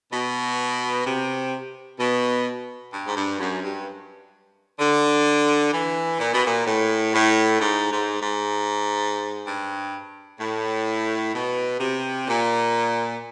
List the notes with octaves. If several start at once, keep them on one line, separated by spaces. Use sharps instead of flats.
B2
C3
B2
G2
G#2
G2
F#2
G2
D3
E3
A#2
B2
A#2
A2
A2
G#2
G#2
G#2
G2
A2
B2
C3
A#2